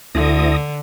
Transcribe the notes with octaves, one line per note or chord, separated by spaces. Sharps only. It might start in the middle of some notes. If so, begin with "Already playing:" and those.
D2 D3 E4 D#6 A#6